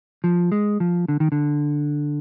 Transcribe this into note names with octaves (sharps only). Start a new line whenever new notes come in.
F3
G#3
F3
D3
D#3
D3